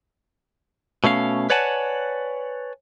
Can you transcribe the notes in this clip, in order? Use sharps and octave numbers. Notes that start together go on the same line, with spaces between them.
B2 A3 C#4 F5
B4 C#5 D5 F#5 G#5 A5